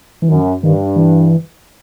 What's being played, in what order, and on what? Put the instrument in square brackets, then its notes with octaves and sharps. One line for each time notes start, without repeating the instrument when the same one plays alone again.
[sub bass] E3
[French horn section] F#2 [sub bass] D#3
[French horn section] G2 [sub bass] D#3
[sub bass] E3